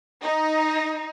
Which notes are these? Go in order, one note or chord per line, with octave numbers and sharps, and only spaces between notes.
D#4